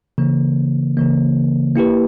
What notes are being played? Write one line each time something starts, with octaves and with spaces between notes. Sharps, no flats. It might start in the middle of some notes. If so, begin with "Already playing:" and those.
C#3 E3 A#3
C#3 E3 A#3
A#3 E4 G4 B4